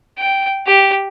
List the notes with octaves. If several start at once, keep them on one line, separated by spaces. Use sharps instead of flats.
G5
G4